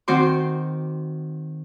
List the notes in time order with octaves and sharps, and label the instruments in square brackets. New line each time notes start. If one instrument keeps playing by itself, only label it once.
[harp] D#3 C4 F#4 C6 D6